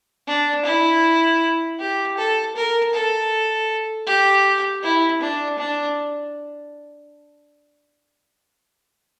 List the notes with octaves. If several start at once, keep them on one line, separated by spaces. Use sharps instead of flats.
D4
E4
G4
A4
A#4
A4
G4
E4
D4
D4